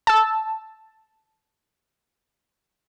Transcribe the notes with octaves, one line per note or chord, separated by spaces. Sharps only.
A5 E6